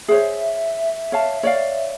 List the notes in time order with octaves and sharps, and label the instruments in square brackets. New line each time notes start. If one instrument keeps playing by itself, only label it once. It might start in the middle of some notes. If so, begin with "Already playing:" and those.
[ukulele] G#4 C5 C#5 [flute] E5
[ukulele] C#5 F5 A5
C#5 D5 F5